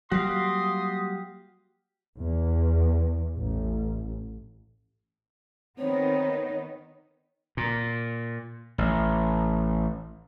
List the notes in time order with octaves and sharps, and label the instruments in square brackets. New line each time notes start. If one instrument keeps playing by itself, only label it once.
[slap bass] F#3 G3 A#3 [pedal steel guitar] F#4 G4 F5 [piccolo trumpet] C6 [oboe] D#6
[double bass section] E2
A1
[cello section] D#3 B3 D#4 [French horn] C4 [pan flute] C#5
[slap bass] A#2
A1